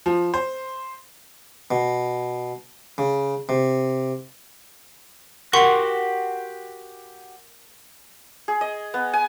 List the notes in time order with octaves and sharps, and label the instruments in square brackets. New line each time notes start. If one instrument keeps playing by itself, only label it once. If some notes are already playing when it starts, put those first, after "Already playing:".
[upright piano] F3
C5
[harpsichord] B2
C#3
C3
[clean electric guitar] F#4 G4 C6 [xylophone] A#4 F#5 C#6
[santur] G#4
D#5
B3
G#5